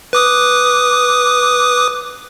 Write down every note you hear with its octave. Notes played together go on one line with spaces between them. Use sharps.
B4 D6 D#6